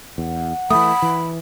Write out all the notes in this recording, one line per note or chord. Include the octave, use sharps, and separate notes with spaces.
E2 F#5
E3 F3 A3 B5 D#6
E3